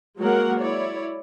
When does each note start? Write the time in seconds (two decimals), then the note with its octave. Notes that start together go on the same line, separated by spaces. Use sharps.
0.19 F#3 G#3 A#3 G#4 A#4 F#5
0.61 E4 C#5 D5